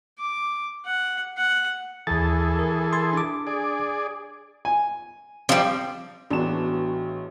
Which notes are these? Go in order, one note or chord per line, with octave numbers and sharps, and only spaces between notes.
D6
F#5
F#5
D#2 E3 G#4 A4 A6
A#4
C6 G#6 A6
D4 D6
G#4 D5
G#5
F3 G3 C4
A1 F#3 G#3 A3 B3 D4 E7